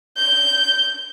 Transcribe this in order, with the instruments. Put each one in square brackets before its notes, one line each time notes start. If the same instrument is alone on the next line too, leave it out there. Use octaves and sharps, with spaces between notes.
[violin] G6